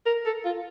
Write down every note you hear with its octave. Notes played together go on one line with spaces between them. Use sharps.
A#4
A4
F4